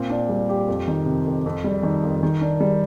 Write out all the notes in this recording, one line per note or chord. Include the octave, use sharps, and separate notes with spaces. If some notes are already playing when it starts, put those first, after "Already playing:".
Already playing: A#2 C4
D4
G3
G4
F2
D#3
C3
F2
F2
G3
D#3
F2
D#3
D4
G3